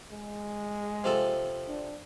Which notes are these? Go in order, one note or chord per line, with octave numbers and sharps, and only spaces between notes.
G#3
C3 F3 A4
D4